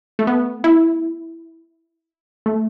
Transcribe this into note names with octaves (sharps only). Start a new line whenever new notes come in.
A3
B3
E4
A3